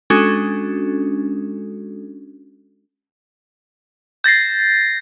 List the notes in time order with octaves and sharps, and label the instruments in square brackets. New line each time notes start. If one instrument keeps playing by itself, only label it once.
[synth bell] G#3 C#4 D4 F#4 A4
[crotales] G6 A6 A#6 C7